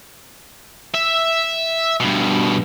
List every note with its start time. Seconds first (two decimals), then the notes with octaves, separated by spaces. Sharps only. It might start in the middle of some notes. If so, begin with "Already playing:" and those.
0.94 E5
2.00 G2 B2